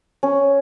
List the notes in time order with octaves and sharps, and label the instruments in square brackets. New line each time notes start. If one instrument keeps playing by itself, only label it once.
[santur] C#4